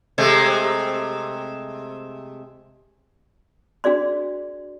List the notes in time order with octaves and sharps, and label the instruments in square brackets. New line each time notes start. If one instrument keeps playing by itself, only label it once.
[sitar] C3 G#3 A3
[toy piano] D4 F#4 G#4 D5 C6